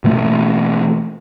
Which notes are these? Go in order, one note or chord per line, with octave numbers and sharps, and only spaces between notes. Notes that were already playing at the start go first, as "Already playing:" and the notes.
B2 E3 A3 A#3